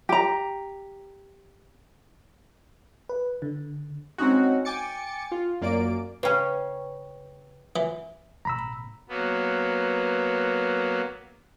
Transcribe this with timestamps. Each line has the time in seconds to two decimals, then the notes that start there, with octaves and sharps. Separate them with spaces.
0.09 G4 A#5
3.09 B4
3.42 D3
4.18 G#3 C4 C#4 D#4 F#4
4.65 G5 G#5 D6 A6 C#7
5.32 F4
5.61 F#2 A#3 D5 D7
6.23 C#3 C#4 B4 G5 C#6
7.76 E3
8.45 A1 B2 A#5 B5 E6
9.09 F#3 A#3 B3